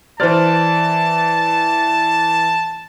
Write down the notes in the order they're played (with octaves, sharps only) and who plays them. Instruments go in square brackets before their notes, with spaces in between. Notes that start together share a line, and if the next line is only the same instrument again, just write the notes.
[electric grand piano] E3 D5 [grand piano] C5 F6 A6 [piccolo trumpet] A5